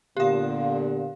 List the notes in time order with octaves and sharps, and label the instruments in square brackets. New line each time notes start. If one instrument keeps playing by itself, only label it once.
[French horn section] A#2 D3 B3 [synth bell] G4 F5